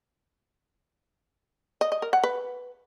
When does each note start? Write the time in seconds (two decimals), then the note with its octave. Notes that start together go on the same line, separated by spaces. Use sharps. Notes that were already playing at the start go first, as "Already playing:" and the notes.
1.81 D#5
1.92 D#5
2.02 A#4
2.13 F#5
2.24 B4